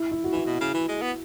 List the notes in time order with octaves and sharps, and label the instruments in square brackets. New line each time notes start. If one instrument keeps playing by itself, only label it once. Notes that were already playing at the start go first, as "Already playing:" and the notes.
Already playing: [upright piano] E4
E4
F#4
[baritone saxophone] E3 [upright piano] E4
[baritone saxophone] B2
C#3
E3
G#3
B3